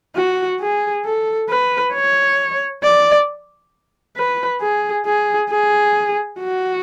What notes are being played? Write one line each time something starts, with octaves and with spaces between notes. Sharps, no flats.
F#4
G#4
A4
B4
C#5
D5
B4
G#4
G#4
G#4
F#4